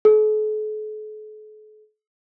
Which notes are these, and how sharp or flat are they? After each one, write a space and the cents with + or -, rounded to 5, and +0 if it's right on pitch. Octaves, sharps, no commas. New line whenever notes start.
A4 -45